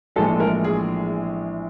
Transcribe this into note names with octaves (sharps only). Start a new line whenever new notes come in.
A#1 A2 E3 G#3 A4
A#4
G#4